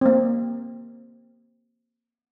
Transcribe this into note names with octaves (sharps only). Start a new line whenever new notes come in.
A#3 C4